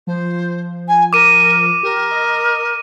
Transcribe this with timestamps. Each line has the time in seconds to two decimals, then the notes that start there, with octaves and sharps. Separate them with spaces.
0.07 F3 C5
0.88 G#5
1.13 A#4 D6 D#7
1.83 G4 A#4
2.11 D#5